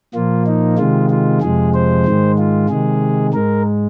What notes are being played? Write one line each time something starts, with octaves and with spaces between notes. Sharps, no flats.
A#2 F3 A#3 F4
D#4
C3 D#3 G#3 F4
F4
F2 C3 F3 G#3 G#4
C5
G#2 D#3 G#3
F4
C3 D#3 G#3 G#4
G#2 G#3 A#4